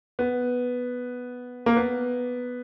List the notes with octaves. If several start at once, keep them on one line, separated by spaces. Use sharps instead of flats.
B3
A#3
B3